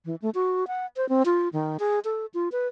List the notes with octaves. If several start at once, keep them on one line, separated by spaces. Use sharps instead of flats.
E3
A3
F#4
F#5
C5
C4
F4
D#3
G#4
A4
F4
B4